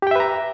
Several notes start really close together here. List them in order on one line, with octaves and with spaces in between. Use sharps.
G4 G5 E5 B4 A#5